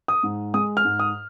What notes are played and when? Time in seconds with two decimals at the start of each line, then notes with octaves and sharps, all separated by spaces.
0.08 D#6
0.23 G#2
0.54 G#3 D#6
0.77 F6
0.85 G#2
0.99 D#6